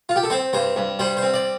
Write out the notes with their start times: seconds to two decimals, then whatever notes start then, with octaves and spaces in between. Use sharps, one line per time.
0.09 F4
0.16 G4
0.23 A4
0.30 C4 C5
0.53 G2 C5
0.76 G2
0.99 G3 C5
1.17 C5
1.22 C4
1.34 D5